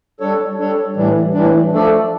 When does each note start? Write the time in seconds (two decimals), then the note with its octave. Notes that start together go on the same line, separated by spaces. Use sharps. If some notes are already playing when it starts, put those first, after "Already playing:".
0.20 G3 D4 A4 C#5
0.58 G3 D4 A4 C#5
0.96 A2 E3 G3 D4
1.33 A2 E3 G3 D4
1.72 F3 A3 D4 A4 D5